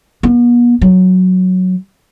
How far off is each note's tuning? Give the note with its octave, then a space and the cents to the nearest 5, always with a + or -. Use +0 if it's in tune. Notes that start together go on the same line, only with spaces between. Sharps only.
B3 -45
F#3 -5